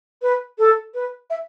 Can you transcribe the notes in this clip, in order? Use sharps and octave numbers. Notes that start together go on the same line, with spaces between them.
B4
A4
B4
E5